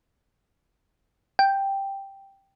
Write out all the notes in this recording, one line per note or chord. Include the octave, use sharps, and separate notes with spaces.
G5